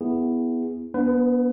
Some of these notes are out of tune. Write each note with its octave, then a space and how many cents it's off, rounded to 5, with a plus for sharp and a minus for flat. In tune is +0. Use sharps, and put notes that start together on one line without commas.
B3 +0 E4 +0 G#4 -15
B3 -25 D4 -25 B4 +30